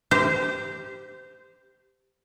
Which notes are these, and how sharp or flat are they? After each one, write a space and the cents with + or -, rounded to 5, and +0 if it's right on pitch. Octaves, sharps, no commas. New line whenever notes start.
G4 +0 C5 -25